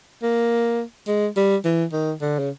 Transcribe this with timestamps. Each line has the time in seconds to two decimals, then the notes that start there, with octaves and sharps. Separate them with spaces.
0.23 A#3
1.08 G#3
1.36 G3
1.65 E3
1.93 D#3
2.21 D3
2.39 C#3